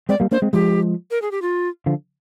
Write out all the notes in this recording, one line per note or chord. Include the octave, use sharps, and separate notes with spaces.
G#3 C4 D5
G3 A#3
A#3 D4 C5
G#3 C4
F3 G#3 G4
A#4
G#4
G4
F4
D3 F3